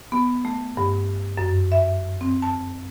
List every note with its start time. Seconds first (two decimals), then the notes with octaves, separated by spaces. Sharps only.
0.12 B3
0.45 A3
0.77 G2
1.38 F#2
1.72 E5
2.21 C4
2.42 A5